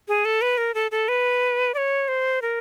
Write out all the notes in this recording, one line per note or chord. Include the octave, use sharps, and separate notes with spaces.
G#4
A4
B4
A#4
A4
A4
B4
D5
C#5
C5
A#4